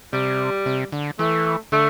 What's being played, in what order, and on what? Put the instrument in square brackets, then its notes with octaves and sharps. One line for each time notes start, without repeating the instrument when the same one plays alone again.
[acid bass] C3 [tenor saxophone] G3
[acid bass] C3
D3
[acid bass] E3 [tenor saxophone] A3
[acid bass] D3 [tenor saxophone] A3